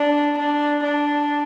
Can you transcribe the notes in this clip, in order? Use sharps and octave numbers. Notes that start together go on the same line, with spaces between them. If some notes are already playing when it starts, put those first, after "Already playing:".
Already playing: D4
D4
D4